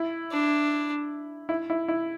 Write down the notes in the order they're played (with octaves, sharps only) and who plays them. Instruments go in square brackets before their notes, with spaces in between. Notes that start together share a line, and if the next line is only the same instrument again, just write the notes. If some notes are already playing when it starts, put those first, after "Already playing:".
Already playing: [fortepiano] E4
[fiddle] D4
[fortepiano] E4
E4
E4